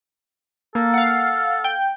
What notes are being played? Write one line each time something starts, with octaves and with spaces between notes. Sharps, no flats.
A#3 A4
F5 F#5
G5